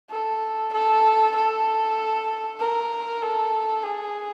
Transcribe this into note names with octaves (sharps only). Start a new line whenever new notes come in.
A4
A4
A4
A#4
A4
G#4